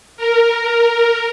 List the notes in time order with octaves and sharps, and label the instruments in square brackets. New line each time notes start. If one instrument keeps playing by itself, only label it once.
[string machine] A#4